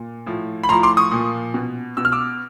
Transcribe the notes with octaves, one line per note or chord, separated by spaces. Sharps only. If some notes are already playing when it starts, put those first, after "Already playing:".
Already playing: A#2
A2 F3
B5
A2 F3 A#5 C6
C6 D6
C#6 D#6
A#2 F3
B2
B2 E6
F6
D6 E6